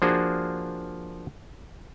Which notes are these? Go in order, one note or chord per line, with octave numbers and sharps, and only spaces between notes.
F3 A#3 D4 F#4 G#4 C5